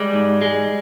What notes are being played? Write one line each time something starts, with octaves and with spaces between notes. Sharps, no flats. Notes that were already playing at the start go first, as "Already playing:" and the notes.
Already playing: G3 G#3
G#2
G#3